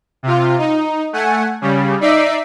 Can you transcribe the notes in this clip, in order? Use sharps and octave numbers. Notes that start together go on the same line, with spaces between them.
C3 F4
D#4
A3 F#5 G#5
C#3 G3
D#4 D5 E5 B6 C7 D7